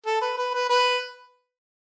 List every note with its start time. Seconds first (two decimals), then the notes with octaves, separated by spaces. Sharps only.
0.06 A4
0.21 B4
0.38 B4
0.54 B4
0.70 B4